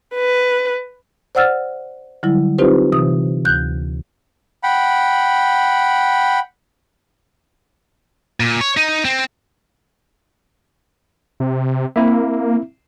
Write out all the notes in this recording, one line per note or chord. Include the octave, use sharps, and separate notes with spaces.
B4
C5 D5 F#5 E6 F6 A6
D3 F#3 G3 E4
C4 D#4 F4 G4 B4 C5
C3 E3 D#6
D2 F#6 G6
F#5 G5 B5
A#2
C#5
D#4
C4
C3
A#3 C4 E4 E5